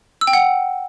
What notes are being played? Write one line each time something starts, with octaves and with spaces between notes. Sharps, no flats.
E6
G5
F#5